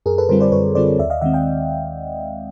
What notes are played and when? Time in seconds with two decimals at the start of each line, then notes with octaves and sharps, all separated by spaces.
0.06 F#2 G#4 A#4
0.18 A4 B4
0.29 D3 G3 C4 F4 A#4 C5
0.40 C5 D5
0.52 F#2 B4 C#5
0.75 D3 G3 C4 F4 C5 D5
0.98 D#2 D5 E5
1.10 D#5 F5
1.21 D#3 G#3 C4 E5 F#5
1.33 F5 G5